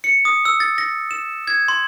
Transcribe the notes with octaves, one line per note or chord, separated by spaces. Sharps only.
C#7
D#6
E6
A6
A#6
E7
G#6
C6